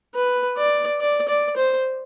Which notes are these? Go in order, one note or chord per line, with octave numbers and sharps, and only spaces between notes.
B4
D5
D5
D5
C5